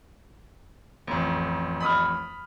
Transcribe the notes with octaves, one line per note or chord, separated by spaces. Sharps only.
A1 F2
B5 D#6 F6